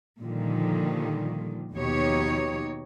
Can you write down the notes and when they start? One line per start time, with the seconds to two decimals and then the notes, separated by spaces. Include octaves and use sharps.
0.21 A#2 D3 D#3 F3 G3
1.73 D#2 B2 F3 D#4 G4 C#5